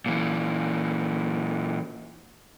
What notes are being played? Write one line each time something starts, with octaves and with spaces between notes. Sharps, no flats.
A#2 E3